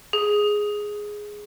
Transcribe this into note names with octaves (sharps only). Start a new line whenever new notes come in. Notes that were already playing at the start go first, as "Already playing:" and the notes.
G#4